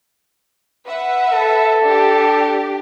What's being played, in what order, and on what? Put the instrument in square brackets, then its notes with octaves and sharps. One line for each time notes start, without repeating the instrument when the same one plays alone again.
[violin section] B4 E5 F#5
[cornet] A4
[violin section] D4 G4